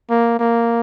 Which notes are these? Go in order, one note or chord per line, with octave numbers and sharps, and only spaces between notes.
A#3
A#3